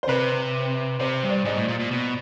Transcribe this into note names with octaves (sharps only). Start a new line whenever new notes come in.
C5
C3 B4
C3 C5
G2
D5
G#2 D#5
A2
A#2
A#2
B2